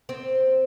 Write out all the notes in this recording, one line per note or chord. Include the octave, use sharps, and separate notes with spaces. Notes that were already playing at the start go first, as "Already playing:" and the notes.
C4